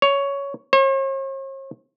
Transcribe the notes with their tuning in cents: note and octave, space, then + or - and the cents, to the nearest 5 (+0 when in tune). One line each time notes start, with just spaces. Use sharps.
C#5 +10
C#5 -45